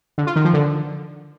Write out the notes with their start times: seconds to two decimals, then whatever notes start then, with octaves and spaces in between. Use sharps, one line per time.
0.18 D3
0.27 F4
0.36 D#3
0.45 F3
0.54 D3